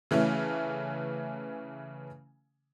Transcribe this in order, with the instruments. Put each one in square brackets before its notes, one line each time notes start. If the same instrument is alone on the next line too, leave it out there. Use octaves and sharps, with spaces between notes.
[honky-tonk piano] C#3 E3 A3 C#4